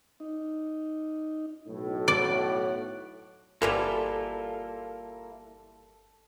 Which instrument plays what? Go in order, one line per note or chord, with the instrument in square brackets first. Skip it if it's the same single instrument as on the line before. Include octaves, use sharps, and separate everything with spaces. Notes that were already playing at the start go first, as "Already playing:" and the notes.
[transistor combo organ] D#4
[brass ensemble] B1 A2
[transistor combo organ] C#5 F#5 [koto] D5
[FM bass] G1 [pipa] B2 E3 G3 [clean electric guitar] A#3 E4 F4 [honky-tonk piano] A4